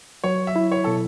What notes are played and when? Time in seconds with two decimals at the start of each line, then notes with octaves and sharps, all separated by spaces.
0.24 F#3 C#5
0.47 E5
0.56 E4
0.72 C#5
0.84 B2 A4